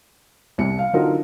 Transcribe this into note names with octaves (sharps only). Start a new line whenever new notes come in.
C2 C#7
F5
D3 F#3 D4 D#4 F4 A#4